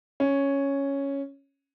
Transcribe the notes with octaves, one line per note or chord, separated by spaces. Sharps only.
C#4